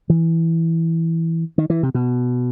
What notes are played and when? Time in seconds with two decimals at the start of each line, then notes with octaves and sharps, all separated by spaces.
0.10 E3
1.58 D#3
1.70 E3
1.83 C3
1.94 B2